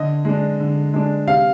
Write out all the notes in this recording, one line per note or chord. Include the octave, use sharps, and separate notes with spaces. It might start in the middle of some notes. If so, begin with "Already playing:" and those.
Already playing: D3 D#5
G#3 D4
D3
G#3 D4
C3 F5